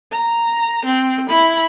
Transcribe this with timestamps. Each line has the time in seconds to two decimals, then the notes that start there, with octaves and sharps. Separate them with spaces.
0.12 A#5
0.85 C4
1.28 E4 B5